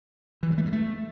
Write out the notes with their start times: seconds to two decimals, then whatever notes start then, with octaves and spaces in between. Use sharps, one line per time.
0.43 E3
0.50 G2
0.58 A3
0.65 G2
0.73 A3